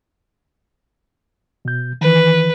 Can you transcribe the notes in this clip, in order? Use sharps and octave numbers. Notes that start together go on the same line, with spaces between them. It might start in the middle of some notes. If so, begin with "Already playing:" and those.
B2 G6
D#3 E3 B4